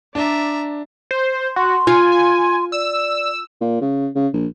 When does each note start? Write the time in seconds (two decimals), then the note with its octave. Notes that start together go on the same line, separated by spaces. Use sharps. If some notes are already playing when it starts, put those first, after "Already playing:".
0.15 D4 D5 E5 A#5
1.11 C5
1.56 F#4 C6
1.87 F4 G#5
2.12 G#5
2.72 D5 E6
3.61 A#2
3.81 C#3
4.15 C#3
4.33 A#1